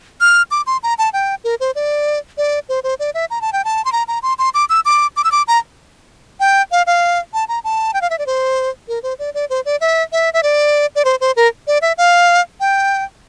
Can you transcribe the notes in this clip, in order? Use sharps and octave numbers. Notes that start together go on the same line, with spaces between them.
F6
D6
C6
A#5
A5
G5
A#4
C5
D5
D5
C5
C5
D5
E5
A#5
A5
G5
A5
C6
A#5
A#5
C6
C6
D6
E6
D6
D6
E6
D6
A#5
G5
F5
F5
A5
A#5
A5
G5
F5
E5
D5
C5
A#4
C5
D5
D5
C5
D5
E5
E5
E5
D5
D5
C5
C5
A#4
D5
E5
F5
G5